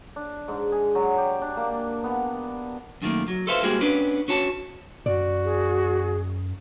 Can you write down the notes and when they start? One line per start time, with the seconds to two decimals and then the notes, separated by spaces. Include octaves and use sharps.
0.16 D4
0.48 G#2
0.72 G#4
0.95 F#3
1.18 G4
1.42 D4
1.57 A#3
2.04 B3
3.02 F#2 D#3 A3 A#3
3.28 F#3
3.47 A4 B4 C5 E5 F5
3.63 G3 G#3 A#3 C4 F#4 G#4
3.81 B3 C#4 D4 B4
4.28 C#4 F#4 C#5 A5
5.06 F#2 F#4 D5
5.45 G#4